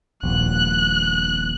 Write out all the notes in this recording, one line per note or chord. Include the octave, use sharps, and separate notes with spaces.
D#1 A#1 F#6